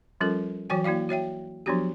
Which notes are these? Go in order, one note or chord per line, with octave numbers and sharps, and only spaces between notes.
F3 G3 C#4 F4 A4 A#4
E3 F#3 F#4 C#5 G5 G#5
A#3 E4 F#4 D5 F5
F#4 C#5 E5 G5
F3 F#3 B3 D4 F#4 G4